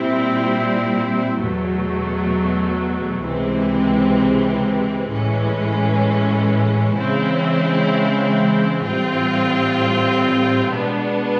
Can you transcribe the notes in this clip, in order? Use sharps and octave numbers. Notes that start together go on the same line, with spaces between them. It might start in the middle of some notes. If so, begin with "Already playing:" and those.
Already playing: A#2 G3 C4 E4
E2 B2 F#3 A3
C#2 C3 E3 G#3 C4
A2 E3 G#3 C#4
C#3 E3 G#3 C4 E4
A2 E3 G3 C4 F4
B2 G#3 B3 D4